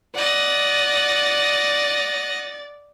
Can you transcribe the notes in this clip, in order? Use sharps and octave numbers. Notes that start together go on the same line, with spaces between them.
D5 D#5 F#5 A6